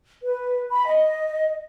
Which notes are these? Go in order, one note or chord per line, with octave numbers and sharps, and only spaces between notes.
B4
B5
D#5